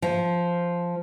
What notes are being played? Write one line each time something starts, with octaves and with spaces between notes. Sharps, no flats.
F3